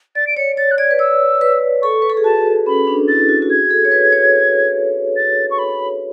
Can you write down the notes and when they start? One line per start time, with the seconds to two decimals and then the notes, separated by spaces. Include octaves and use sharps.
0.15 D5 A6
0.27 D7
0.37 C#5 C#7
0.57 C#5 A6
0.71 F#6
0.78 D5 G#6
0.91 B4
0.99 C#5 E6
1.41 B4
1.82 A4 C#6
2.02 B4
2.10 A4
2.17 G#4
2.24 F#4 A5
2.66 C#4 B5
2.87 D4
3.08 E4 A6
3.29 F#4
3.42 F#4
3.50 G#4 G#6
3.71 A4
3.85 C#5
3.92 B4
4.13 C#5
5.16 A6
5.51 C#6
5.59 B5